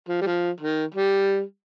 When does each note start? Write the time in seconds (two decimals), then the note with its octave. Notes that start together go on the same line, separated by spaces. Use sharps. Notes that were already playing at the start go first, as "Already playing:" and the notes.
0.08 F3
0.22 G3
0.26 F3
0.60 D#3
0.94 G3